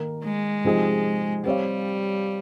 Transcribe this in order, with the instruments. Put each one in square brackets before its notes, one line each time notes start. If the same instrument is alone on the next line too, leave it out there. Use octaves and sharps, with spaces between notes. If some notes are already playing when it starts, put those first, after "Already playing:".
Already playing: [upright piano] D#3 A#3 D#4 A#4
[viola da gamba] G#3
[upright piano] C3 F3 C4 D#4 G#4
[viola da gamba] G3 [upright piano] C4 G4 C#5 F5